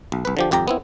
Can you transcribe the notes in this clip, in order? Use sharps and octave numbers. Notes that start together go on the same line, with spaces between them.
B1
C2 B4
D3 F3 G4
G#1 F2 G4 G5 A#5
B3 C4 E4